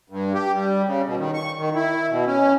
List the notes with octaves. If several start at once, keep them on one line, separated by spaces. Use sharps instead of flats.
G2
G4
G3
C#3
B2
D#3
C#6
D#3
E4
B2
C#4